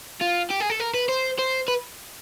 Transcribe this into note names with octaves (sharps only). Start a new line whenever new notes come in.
F4
G4
G#4
A4
A#4
B4
C5
C5
B4